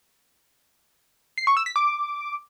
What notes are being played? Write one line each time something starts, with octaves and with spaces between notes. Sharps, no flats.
C7
C#6
E6
B6
D6